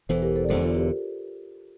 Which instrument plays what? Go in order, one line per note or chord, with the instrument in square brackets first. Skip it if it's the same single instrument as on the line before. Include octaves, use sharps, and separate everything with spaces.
[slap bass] E1 E2 E3 [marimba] A4 C5
[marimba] G4 A#4
A4 C5
D5
[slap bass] E1 E2 D3 [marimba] A4 C5
[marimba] F4 A4
G4 A#4